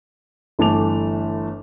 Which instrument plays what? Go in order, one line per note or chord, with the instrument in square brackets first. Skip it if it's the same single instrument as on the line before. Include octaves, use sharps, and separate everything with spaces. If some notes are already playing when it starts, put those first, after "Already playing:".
[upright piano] G1 E3 A3 A5 D6 F7